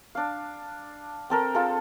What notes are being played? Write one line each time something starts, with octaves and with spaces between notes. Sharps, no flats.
D4 F5
C4 A4 A#4
F4 G#4 A4